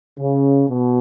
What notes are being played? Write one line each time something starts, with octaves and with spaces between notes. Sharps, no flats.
C#3
B2